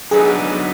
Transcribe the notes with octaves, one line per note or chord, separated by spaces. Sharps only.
D3 F#3 B3 D#4 G#4